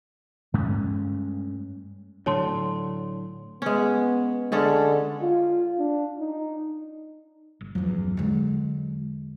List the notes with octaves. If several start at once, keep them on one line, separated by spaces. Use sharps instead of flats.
G2 G#3 A3 C#4
A2 D3 F#3 C#5 A5 C6
G#3 B3 C#4
D3 G#3 C#4 A4
F4
D4
D#4
G1
A1 E2 G2 F3 F#3
E2 D3 F#3 G#3